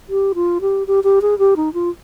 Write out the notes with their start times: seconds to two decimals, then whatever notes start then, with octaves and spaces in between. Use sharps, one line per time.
0.09 G4
0.35 F4
0.61 G4
0.87 G4
1.04 G4
1.22 G#4
1.39 G4
1.56 D#4
1.74 F4